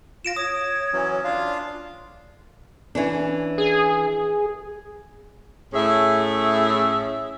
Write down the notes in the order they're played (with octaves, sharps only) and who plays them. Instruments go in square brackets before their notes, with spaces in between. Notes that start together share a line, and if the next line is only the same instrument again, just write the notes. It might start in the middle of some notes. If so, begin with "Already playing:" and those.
[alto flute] F4 [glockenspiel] A#6 D7 E7
[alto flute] C#5 [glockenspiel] D#6
[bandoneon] E3 F#3 C#4
D4 F4 F5
[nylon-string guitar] E3 C#4 D4
[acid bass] G#4
[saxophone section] A2 C#4 G#4 E5